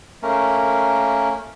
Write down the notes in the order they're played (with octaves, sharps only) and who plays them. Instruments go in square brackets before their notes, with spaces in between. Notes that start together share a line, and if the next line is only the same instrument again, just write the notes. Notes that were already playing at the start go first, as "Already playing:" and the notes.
[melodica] A3 A#3 C#4 A#4